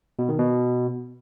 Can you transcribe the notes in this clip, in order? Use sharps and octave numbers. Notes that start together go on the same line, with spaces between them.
B2
D#3
B2